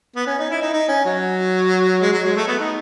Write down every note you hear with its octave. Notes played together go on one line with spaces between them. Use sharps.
B3
C#4
D#4
E4
D#4
D#4
C#4
F#3
G#3
F#3
G#3
A3
B3
D#4